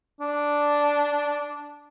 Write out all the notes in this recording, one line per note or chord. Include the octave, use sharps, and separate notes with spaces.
D4